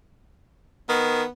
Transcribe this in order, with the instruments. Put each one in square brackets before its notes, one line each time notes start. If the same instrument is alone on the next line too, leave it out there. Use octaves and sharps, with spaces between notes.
[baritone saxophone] D#3 [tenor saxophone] B3